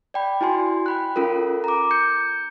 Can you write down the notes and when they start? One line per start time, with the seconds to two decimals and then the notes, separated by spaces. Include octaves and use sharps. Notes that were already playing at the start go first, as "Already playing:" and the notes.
0.14 D5 G5 B5
0.41 E4 F#4 G#5 C6
0.86 G5 B5 F#6
1.16 C#4 F4 A4 A#4
1.64 A#5 D6
1.91 G6 C#7